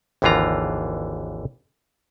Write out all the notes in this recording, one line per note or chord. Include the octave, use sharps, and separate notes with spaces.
G#1 D#2 D3 E3 F4 A#5